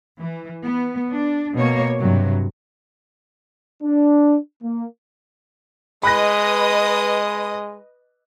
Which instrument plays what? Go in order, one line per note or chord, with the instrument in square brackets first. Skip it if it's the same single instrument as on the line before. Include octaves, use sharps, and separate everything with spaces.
[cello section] E3
B3
D4
B2 A#3 C#5
G2 C3 F#3
[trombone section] D4
A#3
[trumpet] G#3 [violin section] B4 D#5 D#6 [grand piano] B5 F#6 A#6